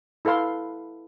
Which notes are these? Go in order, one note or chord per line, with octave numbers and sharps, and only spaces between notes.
E4 A4 B4 F5 C6